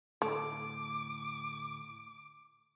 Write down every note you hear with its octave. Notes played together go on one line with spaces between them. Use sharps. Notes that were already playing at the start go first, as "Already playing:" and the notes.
D2 A2 A3 D6